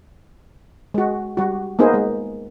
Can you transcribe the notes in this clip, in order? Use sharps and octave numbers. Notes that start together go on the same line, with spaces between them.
G#3 F#4
G3 F#4
A#3 B3 D#4 G#4 C5
G#3